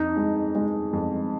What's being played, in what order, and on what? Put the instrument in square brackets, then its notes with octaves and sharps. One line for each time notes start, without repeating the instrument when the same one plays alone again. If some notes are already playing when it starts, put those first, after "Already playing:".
Already playing: [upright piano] F2 [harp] D#4
[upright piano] G#3
G#3
F2